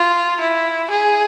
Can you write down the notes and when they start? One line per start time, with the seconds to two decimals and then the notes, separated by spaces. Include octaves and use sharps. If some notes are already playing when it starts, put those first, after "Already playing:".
Already playing: F4
0.40 E4
0.90 G#4